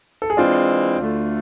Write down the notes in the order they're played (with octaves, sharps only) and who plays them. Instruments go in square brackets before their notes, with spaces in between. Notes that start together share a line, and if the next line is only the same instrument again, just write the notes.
[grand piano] A4
G#4
[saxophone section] E3 G#3 C4 [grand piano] D4 F4
[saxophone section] D2 D3 A3